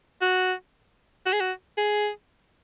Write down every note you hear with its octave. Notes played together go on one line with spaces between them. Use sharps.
F#4
F#4
G#4
F#4
G#4